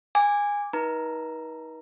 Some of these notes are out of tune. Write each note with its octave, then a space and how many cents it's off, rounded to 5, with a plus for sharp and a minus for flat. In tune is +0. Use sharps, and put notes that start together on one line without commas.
G#5 -15 D6 +0
D#4 +30 B4 -45 A#5 +0